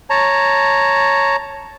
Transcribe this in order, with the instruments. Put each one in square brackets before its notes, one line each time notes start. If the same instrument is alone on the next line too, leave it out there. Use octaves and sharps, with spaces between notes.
[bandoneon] C#5 A5 A#5